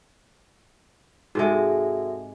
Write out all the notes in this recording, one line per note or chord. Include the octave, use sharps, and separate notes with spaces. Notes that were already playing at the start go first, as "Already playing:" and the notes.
G#2 C3 G#3 F#4 A4 E5